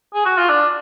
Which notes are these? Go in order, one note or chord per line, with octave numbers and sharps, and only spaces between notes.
G#4
F#4
F4
D4